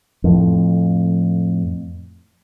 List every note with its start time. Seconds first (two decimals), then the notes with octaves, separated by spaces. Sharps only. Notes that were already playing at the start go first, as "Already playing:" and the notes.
0.24 F2 A2